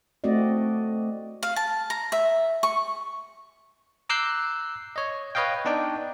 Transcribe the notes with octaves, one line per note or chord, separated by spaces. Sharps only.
A3 C4 F#4 D5 D#5
F5
A5
A#5
E5
C#6
A#5 D6 E6 F#6 G6 C7
C#5 D#5
B4 C#5 D#5 F5 G5
B3 D4 D#4 D5 G5